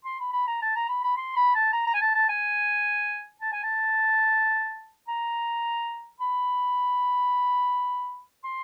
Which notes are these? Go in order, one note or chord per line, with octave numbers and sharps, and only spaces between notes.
C6
B5
B5
A#5
A5
A#5
B5
B5
C6
B5
A5
A#5
A#5
G#5
A5
A5
G#5
A5
G#5
A5
A#5
B5
C6